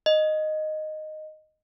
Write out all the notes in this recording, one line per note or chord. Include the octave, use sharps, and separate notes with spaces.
D#5